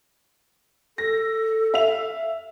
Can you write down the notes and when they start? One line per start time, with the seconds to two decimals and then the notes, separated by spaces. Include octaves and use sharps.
0.98 A4 A#6
1.74 E5 F5 F7